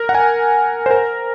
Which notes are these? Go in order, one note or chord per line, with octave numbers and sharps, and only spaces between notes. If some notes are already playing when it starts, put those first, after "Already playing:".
Already playing: A#4
F#5
G#5
C5
A#4